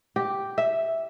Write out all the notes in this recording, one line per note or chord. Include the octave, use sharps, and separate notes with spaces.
G4
E5